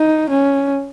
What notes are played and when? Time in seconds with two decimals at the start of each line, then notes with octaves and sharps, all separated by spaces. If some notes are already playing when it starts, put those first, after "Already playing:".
Already playing: D#4
0.30 C#4